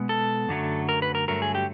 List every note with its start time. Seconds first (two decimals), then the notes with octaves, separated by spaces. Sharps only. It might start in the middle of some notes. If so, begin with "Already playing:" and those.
Already playing: B2 G#3 B3
0.09 A4
0.48 F#2 D3 F#3 A3
0.89 A#4
1.02 B4
1.15 A#4
1.28 G2 D3 F#3 A3 A#4
1.42 G#4
1.55 G4